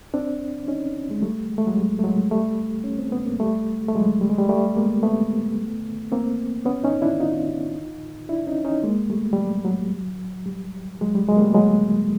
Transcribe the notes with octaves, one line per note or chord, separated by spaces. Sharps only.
C4 D4
C#4 D#4
G#3
G3 A3
G#3
A3
F#3 G#3
G3
A3
F#3 G#3
G3 A3
C#4
C4
B3
A#3
G3 A3
A3
F#3 G#3
G3
G#3
G3
G3 A3
G#3 A#3
A3 B3
A#3 C4
B3 C#4
C#4 D#4
D4 E4
D#4 F4
D4 E4
C#4 D#4
C#4 D#4
G#3 A#3
G3 A3
G3
F#3
F#3
G3
F#3 G#3
G3
F#3 G#3
A#3
G3 A3
F#3 G#3